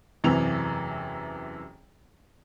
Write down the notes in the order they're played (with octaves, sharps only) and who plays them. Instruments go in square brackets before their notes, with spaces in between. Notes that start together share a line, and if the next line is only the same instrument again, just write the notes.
[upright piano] E1 F#2 C3 E3 C4 F7